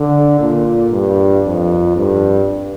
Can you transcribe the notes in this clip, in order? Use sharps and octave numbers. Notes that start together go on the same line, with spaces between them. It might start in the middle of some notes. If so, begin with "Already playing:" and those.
Already playing: D3
A#2
G2
F2
G2